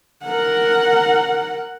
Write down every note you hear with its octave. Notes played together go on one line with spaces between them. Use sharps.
A#4 F#5